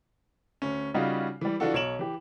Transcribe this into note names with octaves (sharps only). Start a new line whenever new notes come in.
D2 C#4
C#3 G3 C#4 D#4 F4 F#4
E3 G3
E3 D4 F4 F#4 A4
B1 C#5 D7 E7 F#7
E3 G4